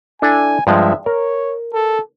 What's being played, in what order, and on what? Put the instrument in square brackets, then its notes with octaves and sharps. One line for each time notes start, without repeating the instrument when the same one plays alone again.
[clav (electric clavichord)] D4 E4 A4 [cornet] G#5
[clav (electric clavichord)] G2 F3 G#3 [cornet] E5
[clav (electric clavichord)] A#4 [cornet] C#5
[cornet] A4